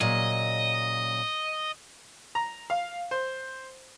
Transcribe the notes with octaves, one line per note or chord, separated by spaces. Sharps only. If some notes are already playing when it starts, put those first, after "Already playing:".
A#2 C#3 F#3 D#5
A#5
F5
C5